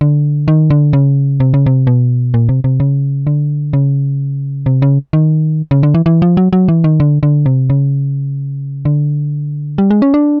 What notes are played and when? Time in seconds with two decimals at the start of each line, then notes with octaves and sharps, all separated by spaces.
0.01 D3
0.48 D#3
0.70 D3
0.93 C#3
1.40 C3
1.54 C#3
1.66 C3
1.87 B2
2.34 A#2
2.49 C3
2.64 C3
2.80 C#3
3.27 D3
3.73 C#3
4.66 C3
4.82 C#3
5.13 D#3
5.71 C#3
5.83 D3
5.94 E3
6.06 E3
6.22 F3
6.37 F#3
6.53 F#3
6.68 E3
6.84 D#3
7.00 D3
7.23 D3
7.46 C3
7.70 C#3
8.85 D3
9.78 G3
9.91 G#3
10.02 C#4
10.14 D4